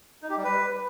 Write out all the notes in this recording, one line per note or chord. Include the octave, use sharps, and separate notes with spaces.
D#4
G4
G3
B4